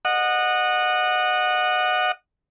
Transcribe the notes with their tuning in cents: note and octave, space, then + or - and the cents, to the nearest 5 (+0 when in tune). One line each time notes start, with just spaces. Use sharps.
D#5 -20 F#5 -10